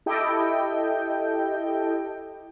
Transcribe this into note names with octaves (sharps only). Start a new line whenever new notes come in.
E4 G4 A4 D#5 G5